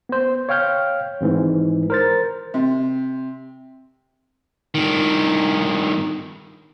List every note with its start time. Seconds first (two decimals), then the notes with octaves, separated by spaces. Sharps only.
0.09 B3 C5
0.49 C#5 F5 G5 F6 G6
1.21 G#1 G#2 E3
1.90 A#4 C5 A6
2.54 C3
4.75 G2 D#3